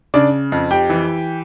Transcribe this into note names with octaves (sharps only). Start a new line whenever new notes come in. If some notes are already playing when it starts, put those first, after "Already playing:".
C#3 D4 D5
F2
G4 G5
E3